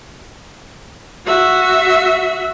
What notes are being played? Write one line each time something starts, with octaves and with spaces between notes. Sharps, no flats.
F#4 E5